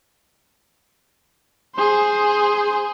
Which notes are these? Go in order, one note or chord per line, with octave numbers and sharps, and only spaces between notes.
G#4 C5